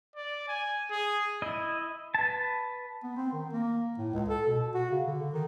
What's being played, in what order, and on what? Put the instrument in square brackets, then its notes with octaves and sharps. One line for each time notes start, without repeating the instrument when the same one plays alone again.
[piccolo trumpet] D5
G#5
G#4
[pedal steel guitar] E4 D#5
B4 A5
[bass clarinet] B3
C4
D#3
A#3
A2
C#2
A4
B2
F#4
C#3
D3
D#3